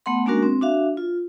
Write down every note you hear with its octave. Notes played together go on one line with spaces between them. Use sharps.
A3 B3 F#5 C6
G#3 A#3 C#4 D4 F#4 A#4
C4
D4 F#4 E5 F5
F4